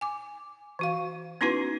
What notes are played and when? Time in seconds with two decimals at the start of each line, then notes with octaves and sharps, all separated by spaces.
0.01 G#5 D6
0.79 E3 F#4 F5
1.41 B3 C#4 D#4 E4 F#4 B4